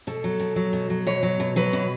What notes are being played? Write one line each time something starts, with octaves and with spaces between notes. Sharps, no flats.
B2 A4
F#3
B2
F#3
B2
F#3
B2 C#5
F#3
B2
F#3 B4
B2